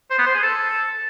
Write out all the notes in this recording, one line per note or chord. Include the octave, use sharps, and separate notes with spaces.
C5
B3
C5
G#4
A4